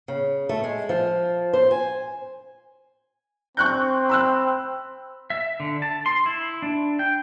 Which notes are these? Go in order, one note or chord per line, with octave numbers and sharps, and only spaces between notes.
C#3
A3
G#3
F3
C5
G#5
C4 C#6 F#6 G6
B5 E6 F#6
E5
D3
A5
C6
E4
D4
G5